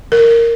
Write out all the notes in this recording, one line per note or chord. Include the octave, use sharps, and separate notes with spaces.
A#4